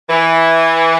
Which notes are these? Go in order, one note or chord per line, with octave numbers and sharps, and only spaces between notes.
E3